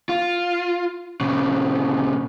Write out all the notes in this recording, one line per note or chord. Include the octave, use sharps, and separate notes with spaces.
F4
A#2 C#3